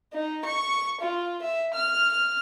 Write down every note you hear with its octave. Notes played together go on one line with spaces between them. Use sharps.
D#4
C#6
F4
E5
F6